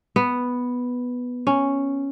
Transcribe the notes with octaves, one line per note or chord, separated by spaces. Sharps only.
B3
C#4